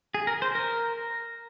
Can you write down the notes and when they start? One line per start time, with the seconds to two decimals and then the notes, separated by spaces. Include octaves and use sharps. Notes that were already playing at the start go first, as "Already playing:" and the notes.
0.14 G#4
0.27 A#4
0.42 C5
0.55 A#4